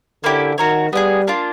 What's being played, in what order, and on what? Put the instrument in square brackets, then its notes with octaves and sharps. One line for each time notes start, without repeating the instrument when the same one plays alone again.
[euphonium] D3 [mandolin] A#3 C#4 E4 G4
[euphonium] D#3 [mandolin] F#4 A#4 C#5
[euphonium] G3 [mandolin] B3 E4 G#4
[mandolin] A#3 D4 F4